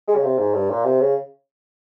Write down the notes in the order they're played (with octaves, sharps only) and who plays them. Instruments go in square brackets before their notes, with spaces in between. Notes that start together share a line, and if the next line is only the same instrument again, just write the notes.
[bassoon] G#3
C#3
C3
G#2
G2
A#2
C3
C#3